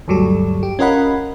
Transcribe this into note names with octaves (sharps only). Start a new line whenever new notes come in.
D2 G2 F#3 G3 A4
G4
C#4 F4 A#4 D#5 F#5 B5